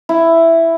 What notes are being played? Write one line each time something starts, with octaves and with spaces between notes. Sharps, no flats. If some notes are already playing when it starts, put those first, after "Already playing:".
E4